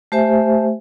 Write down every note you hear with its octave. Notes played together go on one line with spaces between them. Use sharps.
A3 G4 C5 E5 G#5